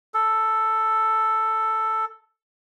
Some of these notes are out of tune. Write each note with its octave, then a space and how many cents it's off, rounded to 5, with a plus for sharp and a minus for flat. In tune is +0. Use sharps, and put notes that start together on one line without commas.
A4 +5